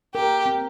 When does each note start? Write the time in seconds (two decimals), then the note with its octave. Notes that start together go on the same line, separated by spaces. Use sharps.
0.15 G4 A#4
0.46 C4